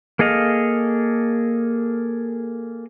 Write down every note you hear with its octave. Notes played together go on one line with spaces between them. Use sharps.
A#3 G#4 A4 D#5 F5